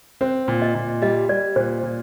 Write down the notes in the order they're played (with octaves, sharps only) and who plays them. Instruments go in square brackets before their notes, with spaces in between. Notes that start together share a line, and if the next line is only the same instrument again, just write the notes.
[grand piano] C4 [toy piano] C5
[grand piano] A#2
[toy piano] D#5
[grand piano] A#2
[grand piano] G3 [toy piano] D#5
[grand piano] G3 [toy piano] D5
[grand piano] A#2 [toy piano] C5
[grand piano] A#2